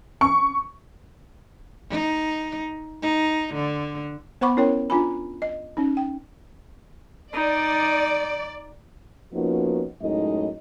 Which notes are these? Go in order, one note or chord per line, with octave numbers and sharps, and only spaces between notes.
C#6
D#4
D#4
D3
B3 C5 F#5 B5 C#6 D6
C#4 E4 A#4 C#5 G5
D4 F4 G#5 B5
D#5
C#4 D#4
G5
D#4 D5
F3 A#3 B3 C#4 D#4 F#4
F#2 A2 G#3 D#4 D#5